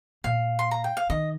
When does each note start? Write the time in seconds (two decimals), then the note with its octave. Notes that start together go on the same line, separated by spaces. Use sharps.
0.24 A#2 F5
0.59 C6
0.71 A#5
0.84 G5
0.97 F5
1.10 D#3 D#5